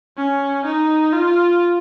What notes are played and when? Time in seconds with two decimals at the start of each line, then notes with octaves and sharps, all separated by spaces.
0.17 C#4
0.65 D#4
1.13 F4